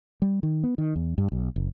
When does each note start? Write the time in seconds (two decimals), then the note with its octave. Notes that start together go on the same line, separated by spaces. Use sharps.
0.22 G3
0.43 D#3
0.64 B3
0.78 D#3
0.96 E2
1.18 G2
1.32 B1
1.56 F#1